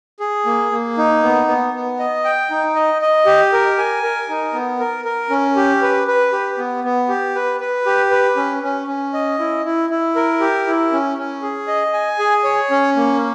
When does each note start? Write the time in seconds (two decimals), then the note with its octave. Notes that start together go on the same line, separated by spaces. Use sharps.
0.20 G#4
0.46 A#3
0.72 A#3
0.98 D#4
1.23 B3
1.47 B3
1.74 B3
1.99 D#5
2.24 G5
2.51 D#4
2.75 D#5
3.02 D#5
3.26 G4
3.53 A#4
3.78 G#5
4.03 A#4
4.29 D#4
4.53 B3
4.79 A#4
5.05 A#4
5.30 C#4
5.56 G4
5.82 B4
6.08 B4
6.32 G4
6.58 B3
6.84 B3
7.09 G4
7.35 B4
7.60 B4
7.86 G4
8.11 B4
8.37 C#4
8.63 C#4
8.87 C#4
9.13 D#5
9.39 E4
9.65 E4
9.90 E4
10.16 A#4
10.40 G4
10.67 E4
10.92 C#4
11.18 C#4
11.42 G#4
11.68 D#5
11.93 G#5
12.19 G#4
12.44 C#5
12.71 C#4
12.96 A#3